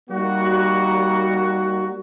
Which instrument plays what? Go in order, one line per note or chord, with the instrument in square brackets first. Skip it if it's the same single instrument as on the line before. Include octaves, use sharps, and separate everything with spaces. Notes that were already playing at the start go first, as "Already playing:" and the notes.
[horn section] G3 A#3 D#4 F#4